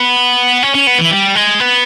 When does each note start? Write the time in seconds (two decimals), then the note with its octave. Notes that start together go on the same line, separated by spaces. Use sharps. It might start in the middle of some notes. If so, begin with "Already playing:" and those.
Already playing: B3
0.63 C#4
0.75 C#4
0.87 B3
0.99 E3
1.11 G3
1.35 G#3
1.60 B3